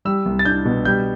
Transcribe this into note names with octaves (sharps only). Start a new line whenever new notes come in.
G3 E6
C2
A6
D4 G6
B2
G3 G6